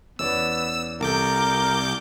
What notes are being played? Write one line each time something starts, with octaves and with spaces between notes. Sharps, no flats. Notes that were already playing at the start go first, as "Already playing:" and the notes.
E2 B3 C#4 D5 E6
C2 A4 A#4 D6 G6